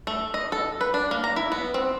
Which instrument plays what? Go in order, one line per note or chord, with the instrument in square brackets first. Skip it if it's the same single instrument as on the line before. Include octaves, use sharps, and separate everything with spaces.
[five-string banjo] A3
D#5
A4
B4
D4
A#3
A#5
E4
B3
C4